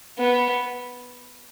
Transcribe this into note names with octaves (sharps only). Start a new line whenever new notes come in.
B3